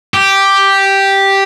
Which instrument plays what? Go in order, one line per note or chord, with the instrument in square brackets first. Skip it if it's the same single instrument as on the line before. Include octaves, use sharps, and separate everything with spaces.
[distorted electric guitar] G4